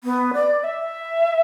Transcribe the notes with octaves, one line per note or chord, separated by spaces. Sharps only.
B3
D5
E5